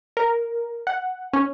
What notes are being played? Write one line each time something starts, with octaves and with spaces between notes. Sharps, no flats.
A#4
F#5
C#4